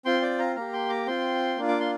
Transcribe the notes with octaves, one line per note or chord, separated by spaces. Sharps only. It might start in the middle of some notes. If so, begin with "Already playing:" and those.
C4 F4 G5 C6
D5 G5
F5 A#5
A#3 G4 F5 A#5
G5 C6
A#5 D6
C4 F4 G5 C6
A#3 D4 F4
D6
C6